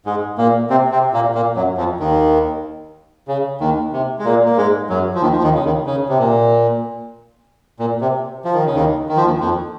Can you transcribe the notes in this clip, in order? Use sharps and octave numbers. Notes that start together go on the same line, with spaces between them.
G#2 G#3
A#2 A#3
C3 C4
C3 C4
A#2 A#3
A#2 A#3
F#2 F#3
F2 F3
D#2 D#3
C#3
D#2 D#3
C3
G#3
A#2 A#3
A#3
G#2 G#3
F#2 F#3
F3
D#2 D#3
F3
D#2 D#3
C#3
D#2 D#3
C#3
C3
A#2
A#2
C3
F3
D#3
C#3
D#2 D#3
D#3
F3
D#2 D#3
F2 F3